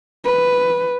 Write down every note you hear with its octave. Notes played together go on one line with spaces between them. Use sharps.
B4